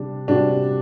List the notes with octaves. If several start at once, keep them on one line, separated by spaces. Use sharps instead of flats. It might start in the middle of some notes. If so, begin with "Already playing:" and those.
Already playing: C3 G3 D4
C3 G3 D4 F#4